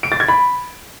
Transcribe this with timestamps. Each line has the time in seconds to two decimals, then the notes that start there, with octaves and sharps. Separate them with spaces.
0.03 D7
0.12 A6
0.20 G#6
0.28 B5